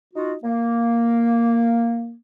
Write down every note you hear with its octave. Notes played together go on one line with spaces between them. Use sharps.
D#4 F4 F#4
A#3